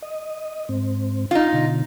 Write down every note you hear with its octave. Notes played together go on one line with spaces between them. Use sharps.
D#5
G#2 C4
D#4 F4 F5
B2 D3